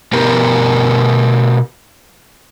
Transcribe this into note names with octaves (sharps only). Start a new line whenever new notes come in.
B2 B3 G4 A#4